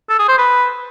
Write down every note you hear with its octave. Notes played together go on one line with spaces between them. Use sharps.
A4
G#4
C5
B4